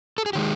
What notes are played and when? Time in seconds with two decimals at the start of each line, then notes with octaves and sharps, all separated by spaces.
0.18 A4
0.26 G#4
0.33 D#3 G#3 G4